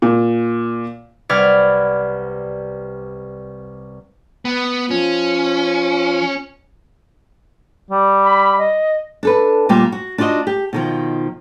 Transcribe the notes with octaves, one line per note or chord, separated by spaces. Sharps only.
A#2
C2 B4 D5 F#5 F6 G#6
B3
F3 C#4
G3
B5
D#5
D4 A4 B4
A#2 G3 A#3 F4 G4
F#4
D4 D#4 F4 F#4 D#5
G4
B2 D#3 F3